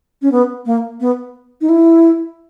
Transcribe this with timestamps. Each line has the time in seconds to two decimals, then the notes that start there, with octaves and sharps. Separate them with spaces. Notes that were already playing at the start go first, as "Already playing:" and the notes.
0.22 C#4
0.32 B3
0.66 A#3
1.00 B3
1.61 D#4
1.69 E4